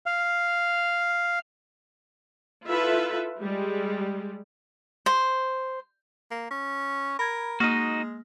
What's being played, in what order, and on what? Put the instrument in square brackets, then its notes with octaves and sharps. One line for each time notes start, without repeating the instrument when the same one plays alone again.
[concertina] F5
[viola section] E4 F4 A4 B4 E5
G3 G#3
[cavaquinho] C5
[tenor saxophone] A#3
C#4
[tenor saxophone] A#4 [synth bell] B5 G#6
[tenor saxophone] G#3 [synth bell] A#3 [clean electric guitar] D#4 F#4